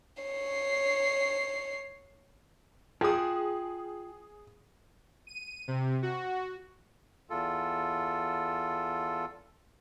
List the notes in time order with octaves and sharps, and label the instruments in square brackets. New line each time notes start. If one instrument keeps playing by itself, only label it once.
[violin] C#5 C7
[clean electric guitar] F4 G5 [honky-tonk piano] G#4 D#6
[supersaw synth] D#7
C3
F#4
[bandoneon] E2 F4 A4